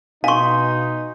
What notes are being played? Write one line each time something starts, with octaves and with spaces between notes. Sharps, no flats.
B2 D#4 F5 G#5 C6 C#6